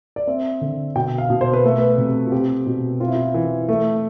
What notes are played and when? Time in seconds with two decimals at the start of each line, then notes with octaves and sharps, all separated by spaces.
0.16 D5
0.27 C4 E5
0.61 D3
0.95 B2 G5
1.18 F5
1.30 B2
1.41 C5
1.53 B4
1.64 A3 A4
1.78 B4
1.98 C3
2.26 F4
2.32 C4 G4
2.66 B2
3.00 C4 F4
3.08 E4
3.15 F4
3.34 E3
3.69 A3